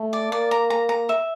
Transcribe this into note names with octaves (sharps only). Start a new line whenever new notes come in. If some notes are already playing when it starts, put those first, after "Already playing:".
Already playing: A3
D5
A#3 D5
A#5
A#5
A#5
E5